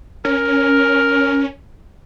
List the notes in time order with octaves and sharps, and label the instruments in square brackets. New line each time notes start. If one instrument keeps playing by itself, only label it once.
[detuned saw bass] C#4 [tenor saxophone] A#4